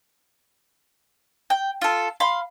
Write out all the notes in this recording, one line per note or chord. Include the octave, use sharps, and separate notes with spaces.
G5
F4 A4
F5 B5 C6